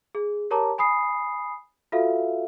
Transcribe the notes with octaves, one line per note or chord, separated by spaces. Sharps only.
G#4
G4 A#4 C#5 A5 A#5 D6
G#5 B5 D#6 C7
F4 F#4 A4 E5 F5